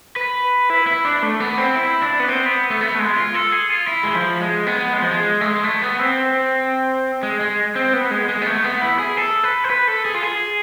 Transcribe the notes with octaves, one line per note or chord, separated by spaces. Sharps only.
B4
E4
E4
D4
A3
B3
C4
E4
D4
B3
C4
B3
A3
B3
A3
G#3
F4
A4
G#4
F4
E4
G#3
F3
G#3
B3
G#3
F3
G#3
A3
G#3
A3
B3
C4
G#3
G#3
C4
B3
G#3
G#3
B3
A3
B3
E4
G#4
A4
B4
C5
B4
A4
G#4
F4
G#4